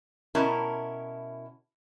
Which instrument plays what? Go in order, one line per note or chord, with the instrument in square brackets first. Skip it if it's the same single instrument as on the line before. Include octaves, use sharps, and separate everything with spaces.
[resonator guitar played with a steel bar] B2 C#4 E4 A#4 A5